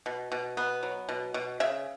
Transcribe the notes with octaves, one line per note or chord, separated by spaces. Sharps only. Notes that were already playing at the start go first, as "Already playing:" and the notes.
B2
B2
B3
F#3
B2
B2
C#3 E5